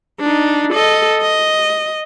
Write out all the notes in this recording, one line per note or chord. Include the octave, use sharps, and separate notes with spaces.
D4 D#4
A4 D#5
D#5